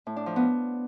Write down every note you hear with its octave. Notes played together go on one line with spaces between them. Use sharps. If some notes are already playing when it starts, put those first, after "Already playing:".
A2
D4
F3
B3